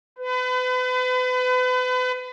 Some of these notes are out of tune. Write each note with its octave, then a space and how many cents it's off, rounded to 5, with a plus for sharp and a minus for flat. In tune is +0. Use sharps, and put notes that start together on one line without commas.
B4 +35